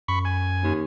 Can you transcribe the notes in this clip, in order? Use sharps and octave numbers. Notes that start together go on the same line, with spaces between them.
F#2 B5 C#6
G#5
D#2